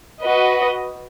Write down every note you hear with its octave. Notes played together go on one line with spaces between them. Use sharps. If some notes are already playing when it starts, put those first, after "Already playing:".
F#4 B4 D#5